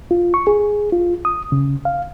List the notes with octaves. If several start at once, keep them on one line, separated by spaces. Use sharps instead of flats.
F4
C#6
G#4
F4
D#6
C#3
F5